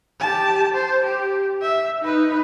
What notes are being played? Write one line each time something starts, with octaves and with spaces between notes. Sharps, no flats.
G4 A5
C5
G4
E5
D#4 B4